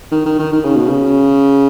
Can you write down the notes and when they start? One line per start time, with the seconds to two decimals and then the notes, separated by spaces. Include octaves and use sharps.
0.12 D#3
0.26 D#3
0.39 D#3
0.53 D#3
0.65 C#3
0.77 B2
0.89 C#3